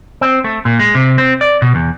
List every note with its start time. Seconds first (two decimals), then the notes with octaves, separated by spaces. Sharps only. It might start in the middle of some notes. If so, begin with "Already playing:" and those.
0.21 C4
0.44 A3
0.65 A#2
0.79 G#3
0.95 C3
1.18 C4
1.41 D5
1.62 B2
1.75 E2